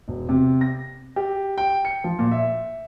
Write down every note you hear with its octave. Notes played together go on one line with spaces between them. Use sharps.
E1
C3
A#6
G4
G5
C#7
F3
A#2
E5